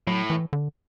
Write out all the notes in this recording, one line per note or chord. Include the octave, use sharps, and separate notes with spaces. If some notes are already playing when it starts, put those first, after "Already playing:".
A2 F#3
E3
D3